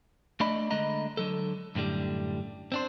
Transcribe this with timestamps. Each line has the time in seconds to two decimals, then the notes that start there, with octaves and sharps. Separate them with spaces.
0.40 A3 D4 D5 D#5 B5
0.70 D3 G#3 A3 D#5 A#5
1.17 D3 F#3 A4
1.75 F#2 A2 D3 G3
2.72 C4 D4 C5